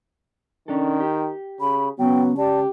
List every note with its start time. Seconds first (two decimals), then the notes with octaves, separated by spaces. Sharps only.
0.68 D#3 C#4 D4 A4
1.00 G4
1.61 C#3 B5
1.99 C#2 F#3 B3 C#4 G5
2.38 G4 D5 A5